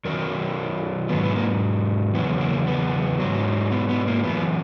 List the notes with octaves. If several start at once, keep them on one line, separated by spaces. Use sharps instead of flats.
F#2 D#3 F#3 A#4
G#2 F#3 B3
B3
A#3
E2 C#3 F#3 B3
A#3
B3
G#2 F#3
B3
B3
A#3
F#2 E3 B3